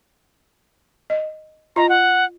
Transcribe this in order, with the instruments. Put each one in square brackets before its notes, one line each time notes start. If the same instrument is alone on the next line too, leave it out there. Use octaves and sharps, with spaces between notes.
[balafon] D#5
[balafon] F4 D#5 [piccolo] A#5
[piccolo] F#5